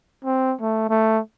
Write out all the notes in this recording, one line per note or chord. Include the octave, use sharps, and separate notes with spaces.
C4
A3
A3